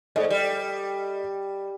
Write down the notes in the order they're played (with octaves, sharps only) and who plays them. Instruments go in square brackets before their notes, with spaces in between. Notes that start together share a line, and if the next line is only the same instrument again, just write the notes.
[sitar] G#2 [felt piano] A4 D5 D#5
[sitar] G3